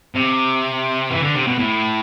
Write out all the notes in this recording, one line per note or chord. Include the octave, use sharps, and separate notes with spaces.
C3
E3
D3
C3
B2
A2